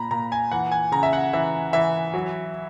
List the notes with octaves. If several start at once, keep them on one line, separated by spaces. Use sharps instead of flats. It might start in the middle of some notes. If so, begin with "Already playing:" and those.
Already playing: A#2 A#5 B5
A#2 A#5
G#5
E3 F#5
G#5
C#3 A#5
E5
F#5
E3 E5
E3 E5
F#3